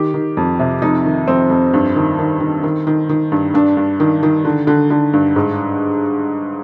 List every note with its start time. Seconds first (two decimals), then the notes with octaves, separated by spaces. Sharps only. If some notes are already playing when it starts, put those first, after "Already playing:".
Already playing: D#3 G4
0.14 D#3
0.37 F2
0.59 C3
0.82 F2 D#4
1.05 D#3
1.27 F2 C4
1.50 F2
1.73 G2
1.96 D#3
2.19 D#3
2.40 D#3
2.63 D#3
2.87 D#3
3.09 D#3
3.32 G2
3.54 G2 D4
3.77 G2
4.00 D#3
4.23 D#3
4.45 D3
4.67 D3
4.90 D3
5.13 G2
5.36 G#2